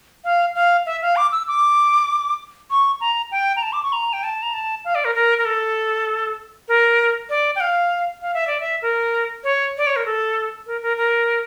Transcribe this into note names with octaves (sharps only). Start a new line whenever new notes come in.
F5
F5
E5
F5
D6
E6
D6
C#6
A#5
G5
A#5
A5
D6
C#6
A#5
G5
A5
A#5
A5
F5
D5
A#4
A#4
A#4
A4
A#4
D5
G5
F5
F5
E5
D5
E5
A#4
C#5
D5
C#5
A#4
A4
A#4
A#4
A#4